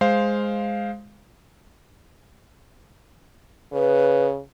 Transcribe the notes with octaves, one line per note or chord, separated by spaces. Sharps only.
G#3 C5 F5
C#3 B4